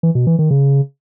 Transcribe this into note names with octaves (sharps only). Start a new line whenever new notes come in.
E3
B2
E3
D#3
C#3